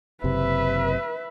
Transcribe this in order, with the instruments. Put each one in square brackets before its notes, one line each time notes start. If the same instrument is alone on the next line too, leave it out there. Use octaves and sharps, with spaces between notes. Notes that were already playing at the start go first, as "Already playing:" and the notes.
[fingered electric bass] F#1 C3 [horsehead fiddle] B4 E5